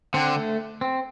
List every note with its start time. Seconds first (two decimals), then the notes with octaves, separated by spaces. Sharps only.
0.14 D3 C4
0.36 A3
0.81 C4